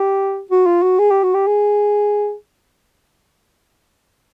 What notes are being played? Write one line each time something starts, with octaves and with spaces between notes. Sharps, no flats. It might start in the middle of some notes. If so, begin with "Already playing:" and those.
Already playing: G4
F#4
F4
F#4
G#4
G4
F#4
G4
G#4